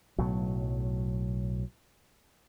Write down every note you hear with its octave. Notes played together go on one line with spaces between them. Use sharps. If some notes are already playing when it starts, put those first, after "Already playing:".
B1 A2 F#3